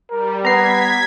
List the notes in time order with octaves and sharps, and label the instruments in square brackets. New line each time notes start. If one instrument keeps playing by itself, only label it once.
[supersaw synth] G3 [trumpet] A#4
[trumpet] B3 [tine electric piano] A#5 C7 [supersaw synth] G#6 B6